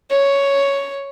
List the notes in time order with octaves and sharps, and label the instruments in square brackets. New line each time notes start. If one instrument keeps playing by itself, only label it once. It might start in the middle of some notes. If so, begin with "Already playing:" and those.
[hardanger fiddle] C#5